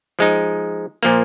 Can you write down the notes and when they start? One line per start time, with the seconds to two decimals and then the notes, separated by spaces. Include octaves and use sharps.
0.19 F3 G#3 D#4
1.03 A#2 F3 A#3